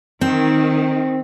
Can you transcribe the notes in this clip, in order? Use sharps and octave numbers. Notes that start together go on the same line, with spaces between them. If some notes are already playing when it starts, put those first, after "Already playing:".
D#3 C4